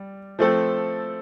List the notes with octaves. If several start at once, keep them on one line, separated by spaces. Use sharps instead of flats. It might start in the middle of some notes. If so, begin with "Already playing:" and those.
Already playing: G3 D5
F3 A3 C4 A4